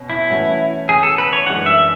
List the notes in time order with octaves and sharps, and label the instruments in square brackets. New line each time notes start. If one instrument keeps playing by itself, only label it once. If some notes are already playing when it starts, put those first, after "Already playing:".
Already playing: [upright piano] B2 C#4
[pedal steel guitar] E4
[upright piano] E3 A3 C#4 F#4
[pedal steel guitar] G#4
A4
B4
C#5
[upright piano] F#2 E3 G#3 D4 [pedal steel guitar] F#5
[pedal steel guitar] E5